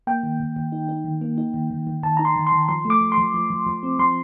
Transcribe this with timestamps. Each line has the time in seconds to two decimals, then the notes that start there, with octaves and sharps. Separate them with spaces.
0.07 A#3 G5
0.23 D#3
0.40 D#3
0.56 D#3
0.72 D#4
0.89 D#4
1.05 D#3
1.21 A#3
1.38 D#4
1.54 D#3
1.71 D#3
1.87 D#3
2.03 D#3 A5
2.17 D#4 A#5
2.25 C6
2.36 D#3
2.47 C6
2.52 D#3
2.68 F3 C6
2.85 A3
2.90 D6
3.01 F3
3.12 C6
3.18 F3
3.34 F3
3.50 F3
3.67 F3
3.83 C4
3.99 F3 C6